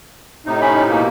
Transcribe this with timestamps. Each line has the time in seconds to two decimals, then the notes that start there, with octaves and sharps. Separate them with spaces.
0.46 A2 C3 D#4
0.62 C#4 B5
0.89 B2 A#3